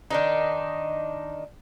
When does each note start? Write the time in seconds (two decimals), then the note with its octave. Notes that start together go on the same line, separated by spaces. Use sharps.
0.11 D#3 D4 D#4